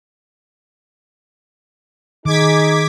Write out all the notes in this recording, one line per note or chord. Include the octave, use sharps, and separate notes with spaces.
D#3 D#4 G#4 D6 G#6 B6